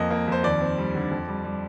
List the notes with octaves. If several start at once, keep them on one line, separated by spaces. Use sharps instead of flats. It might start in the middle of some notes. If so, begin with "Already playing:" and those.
Already playing: F2 A#3 D#5
A#3
F2 C5
D#2 D5
C4
G3
D3
F2
G3
G3